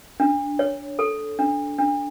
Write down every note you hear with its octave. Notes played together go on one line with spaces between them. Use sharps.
D4
C#5
A4
D4
D4